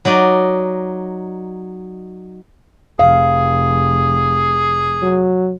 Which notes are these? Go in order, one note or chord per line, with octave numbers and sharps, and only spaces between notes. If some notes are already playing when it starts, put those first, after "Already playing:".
F#3 D#4 D5 D#5
F1 G#4 F5
F#3